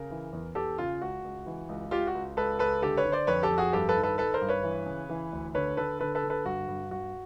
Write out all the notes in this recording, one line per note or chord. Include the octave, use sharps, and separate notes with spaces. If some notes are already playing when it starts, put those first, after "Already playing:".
Already playing: C#3 A#4
E3
E2
E2 G4 A4
C#3 F4
C#2 F#4
C#2
E3
C#2
C#2 F4 G4
F#4
C#2
C#2 A4 B4
C#2 A4 B4
D3 G4 A4
B4 C#5
D3
C5 D5
F2 B4 C#5
G4 A4
F2
F#4 G#4
G2 G4 A4
A4 B4
D#3
A4 B4
D#3 A4 B4
A#4 C5
G2
B4 C#5
E3
C#3
E3
D2
D3 B4 C#5
D3 A4 B4
D3 A4 B4
A4 B4
D3
A4 B4
G2 F#4
G2
G2 F#4